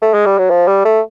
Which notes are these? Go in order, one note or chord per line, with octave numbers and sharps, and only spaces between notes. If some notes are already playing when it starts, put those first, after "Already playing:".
A3
G#3
G3
F#3
F3
G3
A3